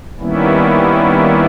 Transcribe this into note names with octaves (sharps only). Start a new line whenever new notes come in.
D#3 G3 A#3 B3 C#4 E4